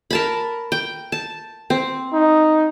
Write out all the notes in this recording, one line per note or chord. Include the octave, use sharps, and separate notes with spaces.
A#4 A5 B5
G5
A5
C4
D#4